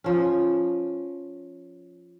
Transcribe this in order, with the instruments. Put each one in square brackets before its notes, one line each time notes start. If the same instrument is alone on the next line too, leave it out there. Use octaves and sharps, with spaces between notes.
[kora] F3 C#4